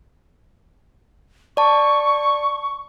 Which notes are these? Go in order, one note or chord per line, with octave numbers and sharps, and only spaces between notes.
D5 A5 C#6